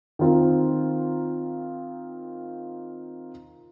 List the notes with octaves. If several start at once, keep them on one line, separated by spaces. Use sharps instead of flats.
D#3 C4 F4 A#4